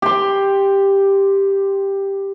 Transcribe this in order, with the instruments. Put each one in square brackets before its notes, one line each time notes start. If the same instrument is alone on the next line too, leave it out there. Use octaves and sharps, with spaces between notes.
[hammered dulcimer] G4 C6